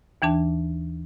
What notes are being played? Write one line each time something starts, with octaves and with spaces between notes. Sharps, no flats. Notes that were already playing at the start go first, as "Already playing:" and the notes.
D#2 E3 D4 A5